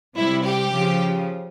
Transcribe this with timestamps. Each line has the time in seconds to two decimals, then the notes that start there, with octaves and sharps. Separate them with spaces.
0.15 C3 G3 E4
0.44 G4
0.72 C#3 F3